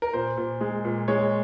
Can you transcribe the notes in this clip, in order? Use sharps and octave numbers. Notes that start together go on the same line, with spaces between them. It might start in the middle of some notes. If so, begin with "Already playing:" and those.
A#4
A#2 C5
A#2
G#3
A#2
G#3 C#5